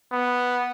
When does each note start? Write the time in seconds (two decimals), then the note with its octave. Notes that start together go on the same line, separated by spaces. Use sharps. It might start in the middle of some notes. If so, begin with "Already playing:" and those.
0.12 B3